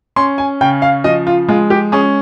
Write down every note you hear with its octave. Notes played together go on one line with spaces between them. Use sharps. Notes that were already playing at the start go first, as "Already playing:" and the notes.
C#4 C6
G#5
C#3 G5
F5
F3 D#5
F4
G#3 F4
G4
C#4 G#4